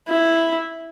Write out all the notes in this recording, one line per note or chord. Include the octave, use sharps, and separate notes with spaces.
E4